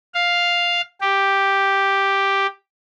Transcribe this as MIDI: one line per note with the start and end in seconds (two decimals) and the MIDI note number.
0.14 0.81 77
1.01 2.47 67